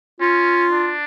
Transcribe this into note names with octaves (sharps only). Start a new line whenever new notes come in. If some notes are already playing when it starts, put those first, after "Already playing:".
C#4 F4
D4